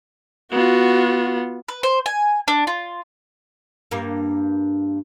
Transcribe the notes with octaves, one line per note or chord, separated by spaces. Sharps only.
B3 F4 F#4
B4
C5
G#5
D4
F4
G2 A#3